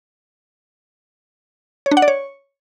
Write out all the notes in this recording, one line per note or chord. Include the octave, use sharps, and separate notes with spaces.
C#5
D4
F#5
D5
C#5